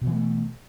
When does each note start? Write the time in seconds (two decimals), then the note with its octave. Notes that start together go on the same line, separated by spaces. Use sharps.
0.01 B2
0.06 E3
0.11 A3